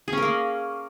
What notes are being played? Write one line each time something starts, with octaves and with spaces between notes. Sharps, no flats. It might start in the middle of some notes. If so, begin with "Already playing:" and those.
A#3 C#4 G#4 A#4